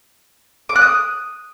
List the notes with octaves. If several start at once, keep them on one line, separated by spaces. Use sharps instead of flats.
D6
F#6
D#6